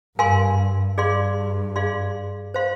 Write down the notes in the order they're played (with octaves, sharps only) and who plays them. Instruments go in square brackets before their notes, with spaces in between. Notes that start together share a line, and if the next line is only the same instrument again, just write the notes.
[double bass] G2 [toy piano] A#4 F5 G#5 C6
[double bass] G2 [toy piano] G#4 D5 F5 C6
[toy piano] G#4 D5 F5 C6
C5 F5 C6